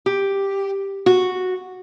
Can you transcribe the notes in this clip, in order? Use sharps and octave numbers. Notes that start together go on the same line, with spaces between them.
G4
F#4